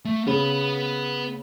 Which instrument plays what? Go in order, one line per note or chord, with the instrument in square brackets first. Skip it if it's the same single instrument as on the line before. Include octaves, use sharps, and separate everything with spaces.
[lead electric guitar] A3
[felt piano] C#3 [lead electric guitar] B3 B5